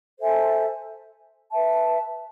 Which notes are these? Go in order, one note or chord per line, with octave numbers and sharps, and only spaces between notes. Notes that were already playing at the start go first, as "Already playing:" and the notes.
A4 C5 E5 G#5
B4 E5 A5